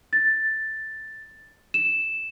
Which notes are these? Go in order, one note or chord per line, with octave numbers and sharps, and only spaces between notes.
A6
E7